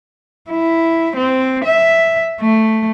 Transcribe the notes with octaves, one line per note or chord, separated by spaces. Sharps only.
E4
C4
E5
A3